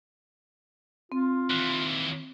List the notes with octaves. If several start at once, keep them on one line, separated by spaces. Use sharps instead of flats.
C4 F4
D#2 E3 F#6